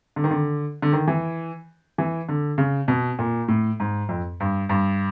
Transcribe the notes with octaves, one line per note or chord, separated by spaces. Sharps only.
D3
D#3
D3
D3
D#3
E3
E3
D3
C#3
B2
A#2
A2
G#2
F2
G2
G2